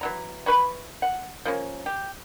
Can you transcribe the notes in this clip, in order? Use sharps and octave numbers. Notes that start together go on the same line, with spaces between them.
E3 F#3 A#5
E3 B4 B5 C#6
F#5
F3 A#3 C#4
G4